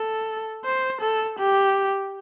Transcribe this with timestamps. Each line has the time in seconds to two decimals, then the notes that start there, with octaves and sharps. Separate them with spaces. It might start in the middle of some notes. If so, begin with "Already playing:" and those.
Already playing: A4
0.64 C5
1.01 A4
1.38 G4